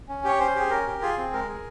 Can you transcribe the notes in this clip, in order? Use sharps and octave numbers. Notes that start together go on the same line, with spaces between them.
C#4
G4 C#5
C#4 C5
G4 G#4
C#4 A#4
G4
F4 G#4
C4
G#3 A#4
G#4